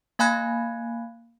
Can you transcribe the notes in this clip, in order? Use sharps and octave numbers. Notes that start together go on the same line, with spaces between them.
A#3 F5 G#5 B5 F#6 G#6